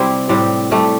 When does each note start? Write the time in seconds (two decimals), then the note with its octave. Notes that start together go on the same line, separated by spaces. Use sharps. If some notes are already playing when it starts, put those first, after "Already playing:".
Already playing: C3 G3 C4 E4
0.29 A2 G3 C4
0.72 G3 A3